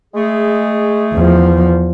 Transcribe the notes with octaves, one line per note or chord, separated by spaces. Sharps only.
G#3 A3 G#4
E2 F3